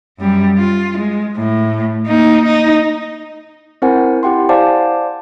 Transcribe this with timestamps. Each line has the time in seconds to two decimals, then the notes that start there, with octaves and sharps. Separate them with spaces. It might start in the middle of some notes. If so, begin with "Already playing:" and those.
0.19 F#2 G3
0.57 F4
0.98 G#3
1.37 A2
2.07 A#3 D#4
2.45 D#4
3.82 C4 E4 A#4 C5 F#5 G#5
4.23 E4 G4 F#5 G5 C6
4.49 C5 D5 F5 G#5 A5 D6